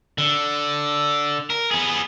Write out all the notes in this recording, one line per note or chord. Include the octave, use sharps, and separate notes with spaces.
D3
A#4
B3 G#4